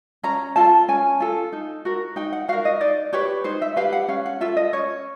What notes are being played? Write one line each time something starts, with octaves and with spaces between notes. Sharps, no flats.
C#4 A#5
F4 A4 A5
C#4 G#5
F4 A4
D#4
F#4 A#4
D#4 G5
F#5
F#4 A#4 F5
D#5
D#4 D5
G4 B4 C#5
D#4 C5
E5
G4 B4 F5
F#5
C#4 F5
F#5
F4 A4 E5
D#5
C#4 C#5